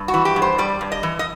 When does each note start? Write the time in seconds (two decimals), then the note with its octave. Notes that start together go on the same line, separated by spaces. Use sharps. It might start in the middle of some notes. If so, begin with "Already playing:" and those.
Already playing: G2
0.08 F#4
0.14 E3
0.25 G4
0.36 G2
0.42 C5
0.58 G3 D5
0.81 G2
0.92 D#5
1.03 E3
1.19 D#5